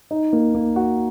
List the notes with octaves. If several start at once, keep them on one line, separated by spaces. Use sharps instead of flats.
D#4
A#3
A#3
F#4